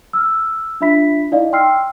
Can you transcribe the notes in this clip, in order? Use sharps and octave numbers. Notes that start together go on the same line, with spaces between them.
E6 F6
D4 F4 E5 B5 B6
D#4 E4 D5 D#5 F5
G5 C6 E6 F6 C7